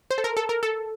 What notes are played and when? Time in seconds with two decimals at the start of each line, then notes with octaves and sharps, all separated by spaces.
0.11 C5
0.18 A4
0.24 A#4
0.37 A4
0.49 A#4
0.63 A4